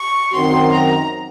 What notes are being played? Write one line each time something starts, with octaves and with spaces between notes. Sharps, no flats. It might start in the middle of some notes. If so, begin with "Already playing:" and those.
Already playing: C#6
F#2 D#3 F#3 C4 F#4 C6
A#5